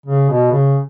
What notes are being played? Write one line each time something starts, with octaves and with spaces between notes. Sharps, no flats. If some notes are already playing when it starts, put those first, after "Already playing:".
C#3
B2
C#3